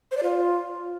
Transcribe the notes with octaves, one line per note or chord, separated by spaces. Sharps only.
C5
D5
F4